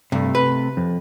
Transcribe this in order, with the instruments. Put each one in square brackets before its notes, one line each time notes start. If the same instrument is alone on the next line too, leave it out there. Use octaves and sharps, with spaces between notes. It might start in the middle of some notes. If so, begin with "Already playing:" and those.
[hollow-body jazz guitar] G2 [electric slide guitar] C3 A3
[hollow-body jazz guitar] B4
[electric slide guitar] F2